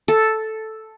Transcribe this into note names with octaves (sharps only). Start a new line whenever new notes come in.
A4